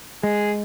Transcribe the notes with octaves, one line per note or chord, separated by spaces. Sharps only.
G#3 G#4